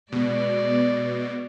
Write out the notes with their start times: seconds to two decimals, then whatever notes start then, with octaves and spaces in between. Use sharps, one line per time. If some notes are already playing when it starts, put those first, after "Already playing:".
0.12 B2 G#3 D5